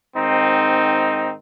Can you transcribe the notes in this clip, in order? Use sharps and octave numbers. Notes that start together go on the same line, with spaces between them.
G#2 D#3 C4 D#4